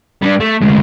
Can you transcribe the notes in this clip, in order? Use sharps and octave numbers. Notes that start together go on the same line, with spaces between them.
G3 D4
A3
D2 G#3